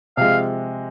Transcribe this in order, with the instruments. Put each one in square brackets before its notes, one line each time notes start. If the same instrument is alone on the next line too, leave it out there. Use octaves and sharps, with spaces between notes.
[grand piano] C3 F3 G#3 [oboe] F5